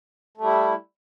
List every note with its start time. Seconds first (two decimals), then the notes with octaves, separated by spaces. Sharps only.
0.38 A3
0.41 G3
0.44 E4